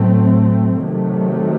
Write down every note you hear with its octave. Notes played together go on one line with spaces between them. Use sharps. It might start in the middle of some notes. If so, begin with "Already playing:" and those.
Already playing: A2 F#3 A3 C4
C3 D#3 F#3 A3